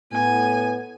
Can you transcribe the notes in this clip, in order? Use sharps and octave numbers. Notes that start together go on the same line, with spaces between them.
A2 B3 G#5